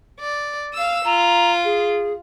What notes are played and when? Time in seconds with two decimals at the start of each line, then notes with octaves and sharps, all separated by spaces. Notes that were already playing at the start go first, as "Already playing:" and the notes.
0.20 D5
0.73 F5 E6
1.05 F4 A#5
1.64 G#4